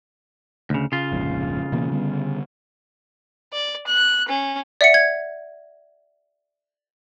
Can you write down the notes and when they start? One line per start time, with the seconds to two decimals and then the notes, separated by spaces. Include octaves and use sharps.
0.70 D2 C#3
0.92 C#3 F4
1.12 F1 A#1 G#2
1.72 B2 E3 A#3
1.91 D3 G3 B3
3.53 D5
3.87 F#6
4.28 C#4
4.81 D5 E5 F#5 C#7
4.94 G#6